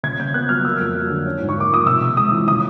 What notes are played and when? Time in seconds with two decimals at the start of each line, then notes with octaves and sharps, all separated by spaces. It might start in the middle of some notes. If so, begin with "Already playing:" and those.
0.03 C#3 G#6
0.19 C#3 G6
0.34 B3 F#6
0.49 F#3 F6
0.64 A#3 E6
0.81 F2
0.95 F#3
1.10 D3
1.26 C#4
1.41 G#2
1.49 C#6
1.57 A#3 D6
1.71 F3 D#6
1.86 C3 E6
2.01 C3
2.17 G#3 D#6
2.32 E3
2.47 C#3 D#6